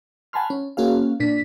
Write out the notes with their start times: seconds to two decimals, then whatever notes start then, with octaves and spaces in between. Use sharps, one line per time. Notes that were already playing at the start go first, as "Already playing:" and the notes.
0.33 F#5 G#5 A5 B5 C6 F6
0.50 C#4
0.77 A#3 C#4 F#4 G#4 F5
1.20 A#2 D4 B6